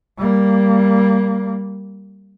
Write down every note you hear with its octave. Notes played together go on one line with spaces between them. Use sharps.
G3 A#3